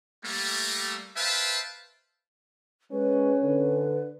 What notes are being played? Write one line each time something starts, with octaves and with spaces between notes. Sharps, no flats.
G3 A3 A#3
B4 C5 E5 F5 G5 A5
G#3 C#4 B4
D3 B4